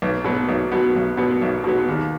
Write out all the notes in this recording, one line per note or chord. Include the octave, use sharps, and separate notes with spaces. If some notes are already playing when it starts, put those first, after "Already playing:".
B1
B2 F#3 B3
B1
B2 F#3 B3
B1
B2 F#3 B3
B1
B2 F#3 B3
D#2